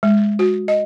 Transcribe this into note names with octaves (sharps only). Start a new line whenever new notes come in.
G#3
F#4
D#5